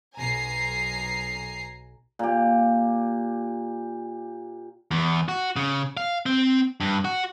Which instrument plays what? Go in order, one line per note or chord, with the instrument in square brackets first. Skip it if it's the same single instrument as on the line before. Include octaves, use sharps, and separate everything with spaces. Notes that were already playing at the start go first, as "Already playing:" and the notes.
[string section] B1 G#5 A#5 C7
[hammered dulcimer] A#2 G4
[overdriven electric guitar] E2
F#4
C#3
F5
C4
G2
F#4